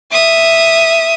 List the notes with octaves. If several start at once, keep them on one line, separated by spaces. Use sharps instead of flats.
E5 D#6